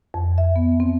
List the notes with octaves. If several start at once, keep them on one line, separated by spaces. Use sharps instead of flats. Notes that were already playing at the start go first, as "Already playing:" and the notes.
F2
E5
B3
C4